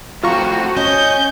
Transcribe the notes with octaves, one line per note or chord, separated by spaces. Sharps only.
F2 A2 C4 F4 F#4 A#5 C#6
C#4 D#5 G6